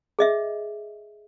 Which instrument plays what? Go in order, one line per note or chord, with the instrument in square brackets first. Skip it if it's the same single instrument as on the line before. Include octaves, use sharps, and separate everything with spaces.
[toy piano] G#4 D#5 E5